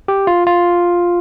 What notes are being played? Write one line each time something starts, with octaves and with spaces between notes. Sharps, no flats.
G4
F4
F4